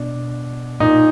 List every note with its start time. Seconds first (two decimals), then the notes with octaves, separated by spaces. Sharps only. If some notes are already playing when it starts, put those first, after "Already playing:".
Already playing: B2 D4
0.80 A#2 D#4